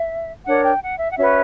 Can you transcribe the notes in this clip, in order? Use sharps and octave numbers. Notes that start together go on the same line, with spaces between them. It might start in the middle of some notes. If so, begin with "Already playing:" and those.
Already playing: E5
D4 A#4 C#5 F#5
G5
F#5
E5
F#5
C#4 F#4 B4 E5